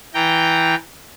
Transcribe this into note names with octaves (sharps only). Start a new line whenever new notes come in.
E3 G5 A#5